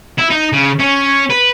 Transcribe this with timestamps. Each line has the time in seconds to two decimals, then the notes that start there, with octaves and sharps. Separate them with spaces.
0.19 E4
0.31 D#4
0.53 C#3
0.80 C#4
1.30 B4